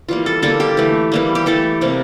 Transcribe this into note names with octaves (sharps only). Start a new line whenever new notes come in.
E3 G3 A#3 F4
A4
D3 G3 A#3 A4
G4
E3 A3
E3 G3 A#3
G4
E3 A3 A4
C3 G3 A#3